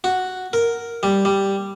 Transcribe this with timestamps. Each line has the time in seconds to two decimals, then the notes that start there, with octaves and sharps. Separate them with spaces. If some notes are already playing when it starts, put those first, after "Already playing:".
0.04 F#4
0.53 A#4
1.03 G3
1.25 G3